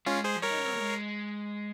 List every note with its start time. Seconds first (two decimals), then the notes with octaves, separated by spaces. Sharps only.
0.06 G#3 C#4 F4
0.24 G#4 C5
0.36 F3
0.42 G3 A#4 C#5
0.50 D#4
0.58 C#4
0.65 C4
0.72 A#3
0.80 G#3